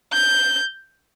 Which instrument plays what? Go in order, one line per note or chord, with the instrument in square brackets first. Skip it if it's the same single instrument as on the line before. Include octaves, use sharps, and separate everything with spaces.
[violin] G6